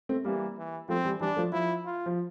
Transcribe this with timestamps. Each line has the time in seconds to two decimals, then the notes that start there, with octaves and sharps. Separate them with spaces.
0.09 A3 C4
0.25 E3 G3 A#3
0.57 E3
0.89 F3 A3 C4
1.05 E3 G3
1.21 E3 G3 D4
1.36 F3 A3
1.52 F3 E4
1.85 F4
2.06 F3